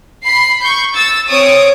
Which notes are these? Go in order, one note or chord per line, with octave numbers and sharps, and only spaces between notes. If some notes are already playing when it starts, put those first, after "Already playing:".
B5 C7
C#6 G6
E6 A6
C4 C#5 D#6 D7